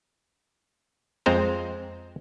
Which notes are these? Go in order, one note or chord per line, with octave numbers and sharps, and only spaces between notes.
F2 G#3 C4 C5 A#5